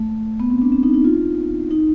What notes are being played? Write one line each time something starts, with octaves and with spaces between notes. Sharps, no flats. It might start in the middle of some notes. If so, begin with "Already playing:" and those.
Already playing: A3
B3
C4
D4
C4
D#4
D#4
F4
D#4